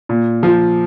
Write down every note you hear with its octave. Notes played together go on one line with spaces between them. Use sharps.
A#2
F3